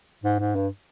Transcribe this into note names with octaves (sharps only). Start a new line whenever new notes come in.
G#2
G#2
G2